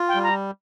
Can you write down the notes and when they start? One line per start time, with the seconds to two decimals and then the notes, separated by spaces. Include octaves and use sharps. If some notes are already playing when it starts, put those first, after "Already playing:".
Already playing: F4
0.09 G5
0.15 G3
0.23 A#5